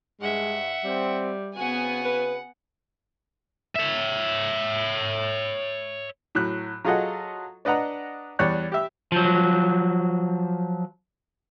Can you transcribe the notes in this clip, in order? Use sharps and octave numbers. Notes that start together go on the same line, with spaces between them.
G2 G#3 E5 F#5
G3 C4
C#3 B3 C4 F#4 F#5 G#5
B4
C#5 E5
A2 F#3 F#6
F#3 F4 G#4 A4 D#5 F#5
D4 B4 D#5 F#5 A#5
E2 G3 C#5 D5 F#6
G4 E5
F3 F#3